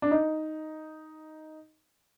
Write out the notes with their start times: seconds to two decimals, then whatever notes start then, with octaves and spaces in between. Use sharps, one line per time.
0.02 D4
0.11 D#4